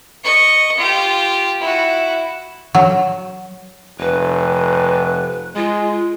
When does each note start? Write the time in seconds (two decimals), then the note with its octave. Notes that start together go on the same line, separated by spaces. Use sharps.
0.24 D#5 C#6
0.77 F4 G4
1.60 E4 F#4
2.75 F#3
3.99 F1 B4
5.56 G#3 F4